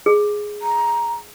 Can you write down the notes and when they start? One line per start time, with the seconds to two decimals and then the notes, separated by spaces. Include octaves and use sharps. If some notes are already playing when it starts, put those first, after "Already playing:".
0.06 G#4
0.62 A#5